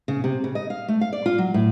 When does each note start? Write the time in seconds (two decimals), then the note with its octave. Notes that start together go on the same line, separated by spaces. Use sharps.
0.08 C#3
0.24 C3
0.44 C#3
0.55 D#5
0.70 F5
0.88 A3
1.01 F5
1.13 D5
1.26 F4
1.38 F#3
1.54 A2